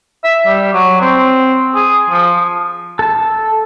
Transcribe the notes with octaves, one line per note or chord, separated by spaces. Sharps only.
E5
G3
F#3
C4
G#4
F3
A4 A5